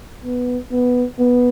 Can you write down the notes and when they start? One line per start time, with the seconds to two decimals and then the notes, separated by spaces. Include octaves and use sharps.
0.24 B3
0.71 B3
1.19 B3